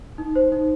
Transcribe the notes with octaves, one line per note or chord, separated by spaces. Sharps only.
D#4
C5
D#4